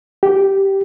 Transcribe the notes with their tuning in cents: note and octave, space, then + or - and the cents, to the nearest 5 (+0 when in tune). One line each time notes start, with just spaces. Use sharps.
G4 -5